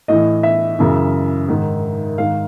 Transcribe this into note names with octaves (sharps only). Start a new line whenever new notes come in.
A2 E3 D#5
E5
F#2 C#3 E3
G#2 D#3
G#2 D#3 F5